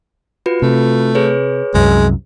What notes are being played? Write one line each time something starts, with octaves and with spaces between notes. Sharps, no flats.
F4 F#4 B4
C3 A3
G#4 B4 C#5
C2 F#2 G#3